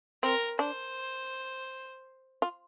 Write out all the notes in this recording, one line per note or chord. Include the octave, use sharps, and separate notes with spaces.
C4 A#4
D4 C5
F4